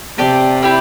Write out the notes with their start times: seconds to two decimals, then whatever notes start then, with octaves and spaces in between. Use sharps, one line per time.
0.18 C3 G4 D5 A5
0.62 E4 G4 D5 G5